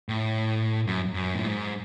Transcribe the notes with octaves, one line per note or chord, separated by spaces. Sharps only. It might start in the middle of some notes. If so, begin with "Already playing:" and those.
A2
F#2
F#2
A2
G#2